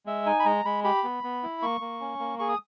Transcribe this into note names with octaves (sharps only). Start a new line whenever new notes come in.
G#3 E5
D#4 G#5
B5
G#3 A#5
G#3 B5
G4 B5
B3
B3
E4
A#3 C#6
A#3
C#4
A#3
G#4 C#6
D#6